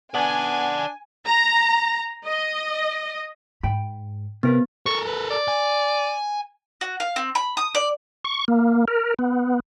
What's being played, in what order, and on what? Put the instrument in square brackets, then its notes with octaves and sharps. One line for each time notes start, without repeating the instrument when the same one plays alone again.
[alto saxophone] B3 [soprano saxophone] D4 [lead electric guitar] D5 F#5 [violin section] G#5
[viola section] A#5
D#5
[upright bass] G#2 [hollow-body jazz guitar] G5 B5
[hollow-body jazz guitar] C3 A#4 B4 [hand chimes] B3
[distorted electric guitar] A4 A#4 [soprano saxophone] C#6
[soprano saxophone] B4
D5
[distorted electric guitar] G#5
[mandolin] F#4
F5
C4
B5
D#6
D5
[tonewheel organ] C#6
A#3
A#4
B3